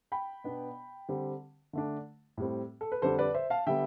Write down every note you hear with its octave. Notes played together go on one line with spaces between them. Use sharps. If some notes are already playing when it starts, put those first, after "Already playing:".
G5 B5
B2 B3 D4
D3 G3 C4
D3 A3 D4
A2 G3 C4
A4
B4
F2 D3 G3 D4 A4 C5
B4 D5
C5 E5
F5 A5
D3 G3 B3 E5 G5